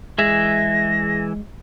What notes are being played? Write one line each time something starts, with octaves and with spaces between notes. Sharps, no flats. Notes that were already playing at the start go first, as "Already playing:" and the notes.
E3 G#3 G#4 E5 A#6